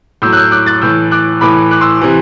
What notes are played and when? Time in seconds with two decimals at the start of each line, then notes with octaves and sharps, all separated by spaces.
0.22 A2 F#3 E6 G6
0.33 F#6
0.37 E6 G6
0.52 D6 F#6
0.66 F#6 A6
0.82 A2 E3 E6 G6
1.11 D6 F#6
1.41 A2 E3 B5 D6
1.71 D6 F#6
1.81 C6 E6
2.01 C3 E3